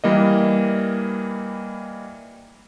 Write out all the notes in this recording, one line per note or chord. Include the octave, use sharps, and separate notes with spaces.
E3 G3 A#3 D#5